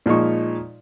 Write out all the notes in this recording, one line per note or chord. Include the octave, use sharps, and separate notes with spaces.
A#2 F3 G#3 D#4 C#6